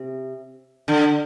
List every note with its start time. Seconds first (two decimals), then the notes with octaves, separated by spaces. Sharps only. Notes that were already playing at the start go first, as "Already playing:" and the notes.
Already playing: C3
0.88 D3